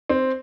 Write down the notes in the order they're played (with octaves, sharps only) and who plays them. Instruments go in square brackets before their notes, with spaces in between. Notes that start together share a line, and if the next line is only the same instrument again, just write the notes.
[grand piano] C4